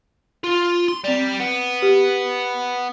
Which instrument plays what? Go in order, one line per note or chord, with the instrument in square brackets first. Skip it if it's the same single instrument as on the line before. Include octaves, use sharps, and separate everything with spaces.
[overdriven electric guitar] F4
C6
[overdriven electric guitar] G3 [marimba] C4 D5
[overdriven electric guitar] B3
[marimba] G4